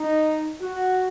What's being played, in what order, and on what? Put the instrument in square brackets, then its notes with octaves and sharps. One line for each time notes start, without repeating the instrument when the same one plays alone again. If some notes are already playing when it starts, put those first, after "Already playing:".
Already playing: [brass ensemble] D#4
F#4